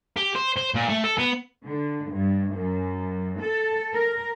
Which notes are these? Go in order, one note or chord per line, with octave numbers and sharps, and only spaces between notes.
G4
C5
C5
A#2
A3
A4
B3
D3
G2
F#2
A4
A#4